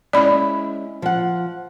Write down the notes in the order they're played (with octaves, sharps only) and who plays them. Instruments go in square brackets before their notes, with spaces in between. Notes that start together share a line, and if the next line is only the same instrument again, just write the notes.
[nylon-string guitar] G#3 C#4 E4 [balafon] D5 B5
[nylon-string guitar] F3 F#5